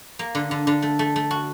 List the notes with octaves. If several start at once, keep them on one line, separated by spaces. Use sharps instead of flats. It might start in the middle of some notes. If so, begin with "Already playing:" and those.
A#3
D3
D3
D3
A3
A3
A3
F#4